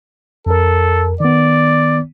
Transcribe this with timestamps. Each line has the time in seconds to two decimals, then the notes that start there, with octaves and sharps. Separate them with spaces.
0.46 F2 A4 A#4
1.20 D#3 B3 D5